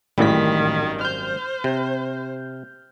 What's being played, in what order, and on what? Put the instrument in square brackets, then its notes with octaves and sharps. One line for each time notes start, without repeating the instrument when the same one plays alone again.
[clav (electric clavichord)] G#1 F#2 G3 [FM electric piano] A2 E3 B6 [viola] D#3
[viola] C5 [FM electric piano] F6 G6
[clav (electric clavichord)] C3